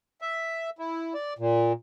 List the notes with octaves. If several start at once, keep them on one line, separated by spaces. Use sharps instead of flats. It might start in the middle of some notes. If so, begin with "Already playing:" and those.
E5
E4
D5
A#2